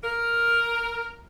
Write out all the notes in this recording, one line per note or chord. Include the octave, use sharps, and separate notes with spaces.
A#4